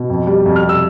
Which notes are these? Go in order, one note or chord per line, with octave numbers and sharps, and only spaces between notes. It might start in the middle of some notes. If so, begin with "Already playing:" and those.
Already playing: B2
F2
G3
F2
F6
C3
E6